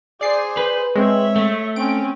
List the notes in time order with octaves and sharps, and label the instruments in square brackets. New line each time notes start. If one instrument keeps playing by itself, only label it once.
[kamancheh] G#4 C5 [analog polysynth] D5 C7
[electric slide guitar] B4
[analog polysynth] G#3 C4 [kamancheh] C#5 E5
[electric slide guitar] A3
[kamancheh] C4 C#4 [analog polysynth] D7